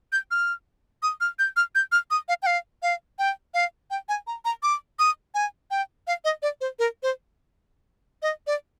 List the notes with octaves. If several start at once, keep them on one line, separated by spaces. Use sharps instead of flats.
G6
F6
D#6
F6
G6
F6
G6
F6
D#6
F5
G5
F5
F5
G5
F5
G5
G#5
A#5
A#5
D6
D#6
G#5
G5
F5
D#5
D5
C5
A#4
C5
D#5
D5